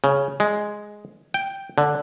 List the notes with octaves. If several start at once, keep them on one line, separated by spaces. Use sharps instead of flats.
C#3
G#3
G5
D3